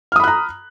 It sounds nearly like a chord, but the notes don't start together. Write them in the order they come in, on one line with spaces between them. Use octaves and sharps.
F6 D#6 B5 F#6 A#5